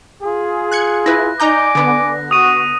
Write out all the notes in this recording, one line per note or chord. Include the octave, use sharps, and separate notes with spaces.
F4 G#4
F#6 G#6 C#7
E4 B4 F#6 A#6
D#4 D5 G#5 A#5 D6 G6
D3 B3
F#4 D#6 D#7